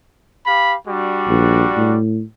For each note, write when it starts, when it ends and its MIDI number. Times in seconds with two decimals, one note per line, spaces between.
0.46 0.75 67
0.46 0.75 77
0.46 0.75 83
0.88 1.97 55
0.88 1.97 62
0.88 1.97 66
1.28 1.64 34
1.76 2.22 45